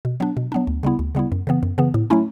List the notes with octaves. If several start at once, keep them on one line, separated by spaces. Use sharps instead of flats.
B2
F#3 B3 D4
B2
F#3 B3 D4
D2
C#3 G3 B3 E4
D2
C#3 G3 B3 E4
F#2
C#3 E3 B3
F#2
C#3 E3 B3
A2
F#3 A3 C#4 E4